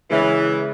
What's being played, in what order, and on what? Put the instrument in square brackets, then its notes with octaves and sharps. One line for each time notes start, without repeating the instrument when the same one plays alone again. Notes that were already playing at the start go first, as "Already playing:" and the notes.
[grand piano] C#3 G#3 C#4 [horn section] E3